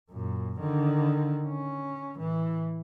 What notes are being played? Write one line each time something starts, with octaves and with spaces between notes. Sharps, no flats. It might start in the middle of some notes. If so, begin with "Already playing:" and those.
F#2 A#2
D3 D#3
C#4
A2 E3